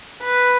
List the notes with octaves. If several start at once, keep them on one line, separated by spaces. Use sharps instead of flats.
B4